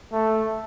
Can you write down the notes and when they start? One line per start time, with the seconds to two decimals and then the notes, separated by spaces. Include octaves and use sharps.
0.13 A3